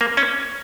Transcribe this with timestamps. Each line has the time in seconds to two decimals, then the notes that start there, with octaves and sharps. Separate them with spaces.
0.01 A#3
0.17 C#4